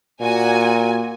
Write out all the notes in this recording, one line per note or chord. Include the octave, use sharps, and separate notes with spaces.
A#2 F#4 G#5